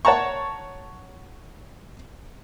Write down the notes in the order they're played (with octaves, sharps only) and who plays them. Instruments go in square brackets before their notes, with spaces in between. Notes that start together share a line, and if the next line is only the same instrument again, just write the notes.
[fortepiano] C#5 F#5 A5 A#5 C#6